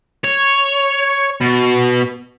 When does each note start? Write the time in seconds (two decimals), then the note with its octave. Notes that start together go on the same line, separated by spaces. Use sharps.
0.24 C#5
1.41 B2